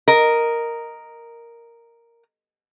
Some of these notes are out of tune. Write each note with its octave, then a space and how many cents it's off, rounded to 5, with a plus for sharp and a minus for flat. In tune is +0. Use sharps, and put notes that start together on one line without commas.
A#4 +0 D#5 +0